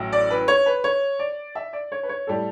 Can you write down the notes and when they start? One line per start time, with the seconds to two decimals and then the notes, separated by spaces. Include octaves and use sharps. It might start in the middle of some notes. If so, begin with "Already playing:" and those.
Already playing: A1 A2 F#3
0.12 D5
0.30 B4
0.48 C#5
0.66 B4
0.84 C#5
1.19 D5
1.55 E5
1.73 D5
1.92 C#5
2.03 B4
2.09 C#5
2.27 A2 G3 A4